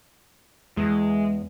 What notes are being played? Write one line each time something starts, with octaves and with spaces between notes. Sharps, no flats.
E2 G#3